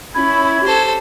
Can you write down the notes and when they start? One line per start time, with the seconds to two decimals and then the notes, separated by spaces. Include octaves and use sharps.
0.14 C#4 E4 B5 G#6
0.65 G4 A4 C5